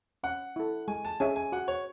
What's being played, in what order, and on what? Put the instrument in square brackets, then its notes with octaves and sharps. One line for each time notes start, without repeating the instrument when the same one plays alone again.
[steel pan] C#4 [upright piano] F#5
[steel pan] E4 A4
[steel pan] G#3 [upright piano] G#5
[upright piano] A5
[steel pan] C#4 G#4 C#5 E5 [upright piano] G#5
[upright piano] G#5
[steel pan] F#4 [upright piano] F#5
[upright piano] C#5